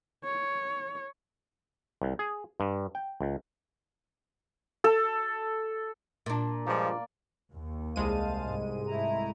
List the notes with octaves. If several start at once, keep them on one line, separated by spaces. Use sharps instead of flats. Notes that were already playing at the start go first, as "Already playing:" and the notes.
C#5
C2
G#4
G2
G5
C#2
A4
A#2 D4
G2 F3 G#3 A#3 D5
D#2
C2 G#3 C5 F5 A5 D#7
G#2
A3 E4 A#5